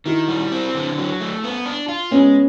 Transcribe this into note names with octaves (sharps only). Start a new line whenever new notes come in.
D#3 E4 F#4
G3
C4
D3
F#3
A3
B3
D4
F4
G#3 B3 C#4